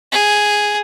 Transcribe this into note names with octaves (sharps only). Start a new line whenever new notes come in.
G#4